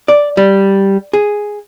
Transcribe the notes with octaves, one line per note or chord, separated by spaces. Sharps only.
D5
G3
G#4